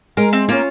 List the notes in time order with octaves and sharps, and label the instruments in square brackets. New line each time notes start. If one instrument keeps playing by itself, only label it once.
[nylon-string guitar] G#3 [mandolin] A#4
[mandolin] C4
[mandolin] A#3 [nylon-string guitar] C#4 F4